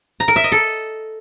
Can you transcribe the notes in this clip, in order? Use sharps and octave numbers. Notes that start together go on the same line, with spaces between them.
A#5
A#4
E5
D#5
A4